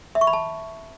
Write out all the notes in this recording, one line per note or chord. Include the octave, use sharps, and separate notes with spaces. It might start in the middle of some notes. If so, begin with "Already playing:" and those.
E5
C#6
B5
A5